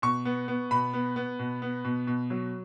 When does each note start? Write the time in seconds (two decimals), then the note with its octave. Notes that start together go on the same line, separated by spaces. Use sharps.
0.02 B2 C#6
0.25 B3
0.48 B3
0.71 B2 B5
0.93 B3
1.16 B3
1.39 B2
1.62 B3
1.84 B2
2.07 B2
2.30 F#3